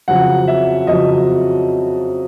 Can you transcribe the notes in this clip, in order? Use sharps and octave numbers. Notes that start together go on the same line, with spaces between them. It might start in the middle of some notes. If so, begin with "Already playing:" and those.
F2 C#3 F#3 F#5
E5
F2 C#3 F#3 D#5